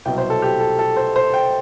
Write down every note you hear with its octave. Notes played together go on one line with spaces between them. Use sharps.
C2 B2 F#3 G5
C5
A4
G4
A4
A4
C5
C5
G5